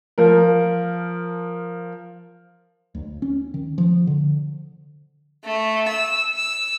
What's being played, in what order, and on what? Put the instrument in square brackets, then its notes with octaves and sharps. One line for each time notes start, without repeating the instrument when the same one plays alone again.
[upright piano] F3 A#4
[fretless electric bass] D2
C#4
D#3
F3
D3
[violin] A3
E6
E6